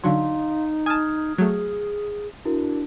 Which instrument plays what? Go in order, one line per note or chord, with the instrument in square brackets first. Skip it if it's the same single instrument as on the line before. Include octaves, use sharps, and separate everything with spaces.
[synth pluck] D3 F#3 [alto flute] D#4 [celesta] F5 C6
[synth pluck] G#5 A5 [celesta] D#6 F6 G#6
[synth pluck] F#3 A3 [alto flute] G#4
[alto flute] D4 [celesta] E4 F#4 A#4